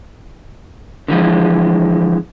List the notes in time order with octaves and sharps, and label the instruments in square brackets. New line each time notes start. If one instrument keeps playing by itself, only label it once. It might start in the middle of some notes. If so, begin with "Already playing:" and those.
[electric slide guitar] D3 E3 F3 G#3